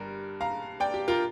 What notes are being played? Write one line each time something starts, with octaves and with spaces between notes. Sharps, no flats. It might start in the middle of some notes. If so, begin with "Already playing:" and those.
Already playing: G1 G2 G3 A#4
F5 A#5
D5 G5
G4
F4 A#4